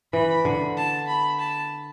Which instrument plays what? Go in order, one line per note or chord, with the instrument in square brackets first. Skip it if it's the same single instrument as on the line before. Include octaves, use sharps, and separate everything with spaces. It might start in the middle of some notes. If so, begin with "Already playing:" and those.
[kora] E3 [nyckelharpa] B5
[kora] D3
[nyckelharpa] A5
B5
A5